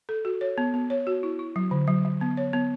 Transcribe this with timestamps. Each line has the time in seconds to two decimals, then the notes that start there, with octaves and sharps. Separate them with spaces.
0.09 A4
0.25 F#4
0.41 C#5
0.58 B3
0.74 B3
0.90 C#5
1.07 F#4
1.23 E4
1.39 E4
1.56 F#3
1.71 D3
1.87 F#3
2.05 F#3
2.21 B3
2.37 C#5
2.53 B3